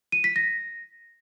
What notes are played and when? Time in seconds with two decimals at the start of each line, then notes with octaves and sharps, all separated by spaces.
0.12 D#7
0.24 B6
0.36 A#6